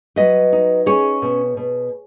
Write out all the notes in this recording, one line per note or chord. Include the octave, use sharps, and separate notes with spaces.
F#3 B4 D#5
D#4
C#4 G#4 C#5
B2
B2